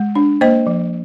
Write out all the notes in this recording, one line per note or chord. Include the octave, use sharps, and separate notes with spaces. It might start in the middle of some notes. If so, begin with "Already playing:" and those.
Already playing: G#3
D4
A#3 C5 D#5
F3